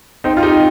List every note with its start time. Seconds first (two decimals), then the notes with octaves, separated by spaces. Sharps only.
0.24 C4 D#4
0.37 F4
0.43 D#4 G4